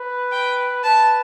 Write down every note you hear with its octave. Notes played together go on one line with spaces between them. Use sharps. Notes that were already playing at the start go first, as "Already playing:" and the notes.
Already playing: B4
G5
B4 A5